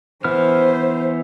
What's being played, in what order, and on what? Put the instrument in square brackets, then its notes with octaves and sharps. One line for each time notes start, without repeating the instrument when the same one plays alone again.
[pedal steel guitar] E3 B3 F6 [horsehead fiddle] C5